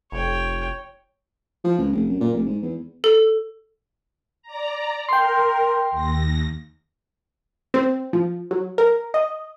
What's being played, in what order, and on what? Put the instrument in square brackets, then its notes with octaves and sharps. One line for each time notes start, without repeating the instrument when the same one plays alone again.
[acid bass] F1 [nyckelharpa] C#5 G5
[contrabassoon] F3
C#2
F1
F#2
A#2
F1
G#2
E2
[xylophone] A4
[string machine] D5 A#5
[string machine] A#4 [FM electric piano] G5 C6
[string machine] D#2 A#6
[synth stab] C4
F3
F#3
A#4
D#5